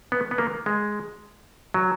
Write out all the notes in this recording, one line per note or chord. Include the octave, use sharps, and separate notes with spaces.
B3
B3
A#3
G#3
F#3